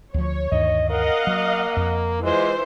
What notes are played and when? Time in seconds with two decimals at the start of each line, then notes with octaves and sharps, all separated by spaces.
0.14 D2 F3 C#5
0.52 D2 G2 D#3 D#5
0.90 A#4 D#5 F5 F#5
1.27 F#3 A#3
1.77 F2
2.23 E3 G#3 F4 C5